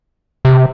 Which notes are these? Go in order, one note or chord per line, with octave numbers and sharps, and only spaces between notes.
C3